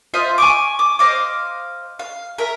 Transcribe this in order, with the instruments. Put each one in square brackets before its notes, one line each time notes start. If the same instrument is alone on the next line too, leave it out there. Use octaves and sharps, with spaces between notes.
[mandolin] F4 C5 D#5 E5
G#5 C#6 D6
D6
C5 D#5 F5 D6
F5
A#4 E5